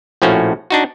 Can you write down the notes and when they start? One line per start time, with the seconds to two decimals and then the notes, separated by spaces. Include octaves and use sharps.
0.22 A#1 A2 F3 A3 C#4 F#4
0.70 D4 D#4 F#4